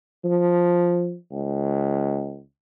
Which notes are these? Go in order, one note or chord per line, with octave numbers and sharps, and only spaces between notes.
F3
C#2